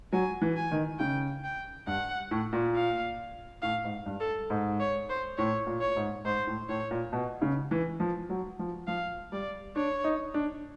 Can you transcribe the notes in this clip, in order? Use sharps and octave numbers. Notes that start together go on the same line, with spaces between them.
F#3 G#5
E3
G#5
D#3
C#3 G5
G5
G2 F#5
A2
A#2
F5
A2 F5
G#2
G2
A4
G#2
C#5
C5
A2 C#5
A#2
C#5
G#2
G#2 C5
A2
A2 C#5
A#2
B2
C#3
E3
F3
F#3
F3
F3 F5
G3 D5
D4 C#5
D#4
D4